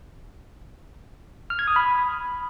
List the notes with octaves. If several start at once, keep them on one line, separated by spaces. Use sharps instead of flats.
F6
G#6
D#6
B5